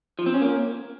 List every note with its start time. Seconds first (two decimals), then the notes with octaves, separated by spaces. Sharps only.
0.19 F3
0.26 C4
0.34 C#4
0.42 A#3